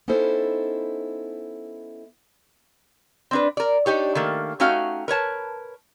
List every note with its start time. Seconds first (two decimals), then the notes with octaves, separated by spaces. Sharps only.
0.08 B3 C#4 D#4 E4 A4 C5
3.31 C4 D4 B4
3.57 A#4 D5
3.86 D4 D#4 G4 C#5
4.15 D#3 A3 A#3
4.60 A3 C#4 D#4 F#4 F5 G5
5.08 A#4 B4 C#5 A5